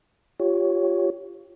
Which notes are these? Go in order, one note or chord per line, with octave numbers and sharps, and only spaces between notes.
F4 G4 C#5